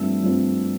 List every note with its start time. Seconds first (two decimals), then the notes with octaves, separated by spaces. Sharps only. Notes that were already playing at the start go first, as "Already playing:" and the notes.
Already playing: G2 F3 A3 C4 E6
0.23 G2 F3 A3 C4